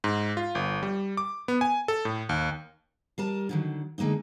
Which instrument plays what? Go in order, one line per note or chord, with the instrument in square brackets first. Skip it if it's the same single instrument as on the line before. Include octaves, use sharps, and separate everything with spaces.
[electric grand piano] G#2
F4
G1
G3
D6
B3
G#5
A4
A2
D#2
[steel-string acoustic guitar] G3 A#4 A5
D3 D#3 F#3
D3 G#3 A#3 B3 D#4